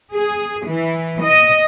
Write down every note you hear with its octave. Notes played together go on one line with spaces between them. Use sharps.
G#4
E3
D#5